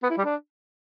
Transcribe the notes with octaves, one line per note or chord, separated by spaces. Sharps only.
B3
E4
G3
D4